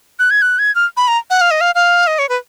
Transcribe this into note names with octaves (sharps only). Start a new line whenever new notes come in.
F#6
G#6
F#6
G#6
F6
B5
A#5
F#5
F5
D#5
F5
F5
D#5
C#5
B4